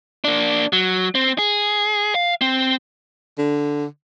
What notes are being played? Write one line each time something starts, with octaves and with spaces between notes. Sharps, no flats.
A#3 D4
F#3
C4
G#4
F5
C4
D3